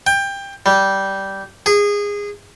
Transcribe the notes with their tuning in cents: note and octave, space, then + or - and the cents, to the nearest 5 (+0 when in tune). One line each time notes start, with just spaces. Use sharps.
G5 +20
G3 -10
G#4 -20